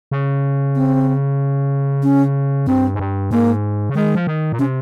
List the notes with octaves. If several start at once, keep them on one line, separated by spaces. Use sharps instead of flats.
C#3
C4
C#4
G2 C4
G#2
G2
G#2 A#3
C#3
D#3 G#3
F3
D#3
A#2
C3 C#4